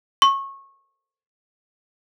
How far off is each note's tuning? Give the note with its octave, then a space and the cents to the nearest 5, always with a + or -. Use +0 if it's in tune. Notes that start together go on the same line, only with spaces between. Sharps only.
C#6 -20